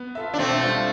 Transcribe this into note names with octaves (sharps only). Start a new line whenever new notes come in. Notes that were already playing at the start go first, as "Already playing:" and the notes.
Already playing: B3
F4 A4 E5
D4
B2 A3 C4
G3 B3 D4 F4